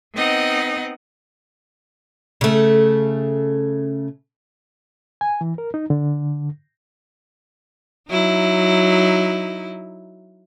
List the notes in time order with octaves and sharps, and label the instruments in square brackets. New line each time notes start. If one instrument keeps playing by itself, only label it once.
[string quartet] B3 C4 D#4 D#5 F#5
[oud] C#3 A3
[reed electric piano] G#5
E3
A#4
D#4
D3
[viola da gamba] F#3 D#4 E4